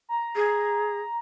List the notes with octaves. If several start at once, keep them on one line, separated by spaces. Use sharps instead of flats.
A#5
G#4